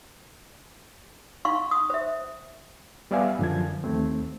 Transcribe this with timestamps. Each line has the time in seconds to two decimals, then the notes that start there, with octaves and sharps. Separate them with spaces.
1.45 D#4 F5 C6 C#6
1.71 D#6
1.90 C5 E5
3.11 G3 B3 D5 E5 F5 G#5
3.39 F#2 D3 F3 G#6
3.84 D#2 A3 C4